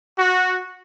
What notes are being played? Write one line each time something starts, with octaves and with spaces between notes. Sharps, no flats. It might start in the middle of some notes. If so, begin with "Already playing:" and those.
F#4